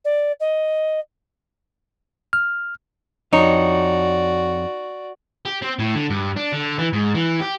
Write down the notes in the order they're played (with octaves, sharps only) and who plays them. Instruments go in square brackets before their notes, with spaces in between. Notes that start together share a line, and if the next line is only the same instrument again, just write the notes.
[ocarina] D5
D#5
[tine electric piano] F6
[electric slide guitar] F2 C#5 [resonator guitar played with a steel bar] D#4 [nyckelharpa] F#4 D5
[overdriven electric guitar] G4
C4
A2
D3
G2
D4
D3
E3
G#2
E3
G4